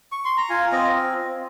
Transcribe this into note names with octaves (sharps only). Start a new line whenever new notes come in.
C#6
C6
A#5
F4 G#5
C4 D#5